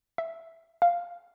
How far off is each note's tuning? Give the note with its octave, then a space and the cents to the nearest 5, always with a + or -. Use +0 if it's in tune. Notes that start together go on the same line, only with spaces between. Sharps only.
E5 +0
F5 -5